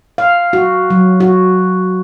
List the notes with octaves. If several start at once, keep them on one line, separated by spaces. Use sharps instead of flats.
F5
F#4
F#3
F#4